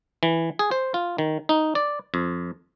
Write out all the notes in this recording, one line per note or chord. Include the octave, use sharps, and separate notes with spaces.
E3
G#4
C5
F4
D#3
D#4
D5
F2